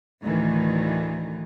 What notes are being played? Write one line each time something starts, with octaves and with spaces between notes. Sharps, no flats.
D2 A2 D#3 E3